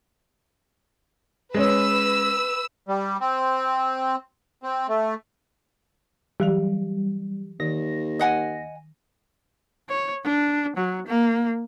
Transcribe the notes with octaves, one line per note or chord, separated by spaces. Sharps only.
G#3 C#4 B4 E6
G3
C4
C4
A3
E3 F#3 G3 G4
D#2 D#3 A#6
D#5 F#5 G#5
C#5
D4
F#3
A#3